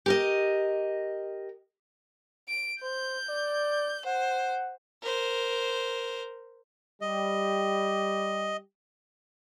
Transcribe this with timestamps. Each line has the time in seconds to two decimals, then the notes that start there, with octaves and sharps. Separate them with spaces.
0.06 G4 A#4 D#5
2.48 D7
2.82 C5 G6
3.29 D5
4.06 C5 F#5
5.02 A#4 C5
7.01 G3 G4 D#5